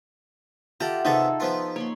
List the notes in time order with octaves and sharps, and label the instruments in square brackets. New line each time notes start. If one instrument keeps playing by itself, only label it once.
[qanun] F4 G4 [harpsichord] A4 A#5 [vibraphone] E5 F#5
[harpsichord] C3 B3 A5 [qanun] D#4 G#4 A4
[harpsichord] F3 B3 F4
[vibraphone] A#3 [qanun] C#5 B5 C6